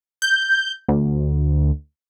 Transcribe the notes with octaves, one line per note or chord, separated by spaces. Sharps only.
G6
D2